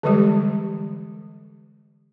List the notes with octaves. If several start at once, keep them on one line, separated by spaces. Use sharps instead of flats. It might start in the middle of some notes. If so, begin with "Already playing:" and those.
D3 E3 G3 G#3 G4